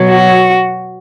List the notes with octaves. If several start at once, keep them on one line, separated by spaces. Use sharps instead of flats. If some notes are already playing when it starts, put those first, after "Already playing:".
Already playing: B2 F#3
F#4